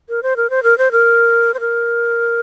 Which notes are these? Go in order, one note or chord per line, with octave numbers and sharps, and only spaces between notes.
A#4
C5
A#4
C5
A#4
C5
A#4
C5
A#4